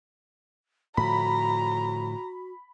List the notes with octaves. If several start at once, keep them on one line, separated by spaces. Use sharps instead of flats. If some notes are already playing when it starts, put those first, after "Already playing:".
A2 D3 F3 F#4 A#5 B5